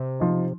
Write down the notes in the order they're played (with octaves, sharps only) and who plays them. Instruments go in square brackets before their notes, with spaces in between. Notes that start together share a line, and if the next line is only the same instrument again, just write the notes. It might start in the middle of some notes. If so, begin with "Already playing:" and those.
Already playing: [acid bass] C3
[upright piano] F3 D#4